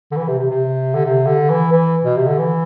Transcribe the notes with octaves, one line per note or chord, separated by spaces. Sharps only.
D3
E3
C3
C3
C3
D3
C3
D3
E3
E3
B2
C3
D3
E3